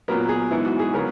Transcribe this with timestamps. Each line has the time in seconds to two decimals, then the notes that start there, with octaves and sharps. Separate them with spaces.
0.08 A#2 F#3 B3 A#4
0.29 G#4
0.51 G#2 E3 B3 E4
0.65 F#4
0.79 G#4
0.94 C#3 F#3 B3 A#4